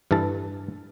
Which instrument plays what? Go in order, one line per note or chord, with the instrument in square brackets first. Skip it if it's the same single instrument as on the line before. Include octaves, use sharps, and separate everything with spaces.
[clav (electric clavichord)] G2 E3 A4 A5